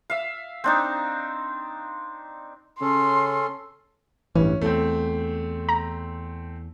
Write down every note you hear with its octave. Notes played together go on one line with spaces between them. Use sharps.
E5 F5
C4 D4 D#4
C#3 C#4 A4 C6
A1 G2 E3 C#4
E2 A3 C4
A#5